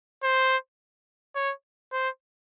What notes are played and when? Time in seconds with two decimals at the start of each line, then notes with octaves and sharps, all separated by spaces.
0.23 C5
1.35 C#5
1.92 C5